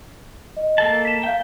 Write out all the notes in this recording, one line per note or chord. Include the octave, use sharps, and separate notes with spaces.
D#5
A#3 A4 A5
B6 E7
E5 F5 G5 G6